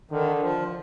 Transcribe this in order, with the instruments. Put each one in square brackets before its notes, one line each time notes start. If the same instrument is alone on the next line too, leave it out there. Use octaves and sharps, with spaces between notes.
[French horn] D3 [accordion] D#3
[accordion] F3